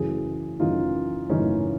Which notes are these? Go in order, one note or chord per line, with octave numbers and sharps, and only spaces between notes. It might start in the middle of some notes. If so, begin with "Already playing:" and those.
Already playing: F#2 C#3 E3 F#4 G#4
F#2 C#3 E3 D#4 F4
F#2 C#3 E3 C#4 D#4